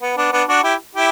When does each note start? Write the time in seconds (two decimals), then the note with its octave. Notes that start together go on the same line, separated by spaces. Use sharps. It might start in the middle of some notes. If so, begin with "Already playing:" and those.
0.02 B3
0.17 B3 D4
0.32 B3 D4
0.48 D4 F#4
0.64 E4 G4
0.95 E4 G4